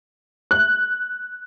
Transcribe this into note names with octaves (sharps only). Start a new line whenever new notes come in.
F#6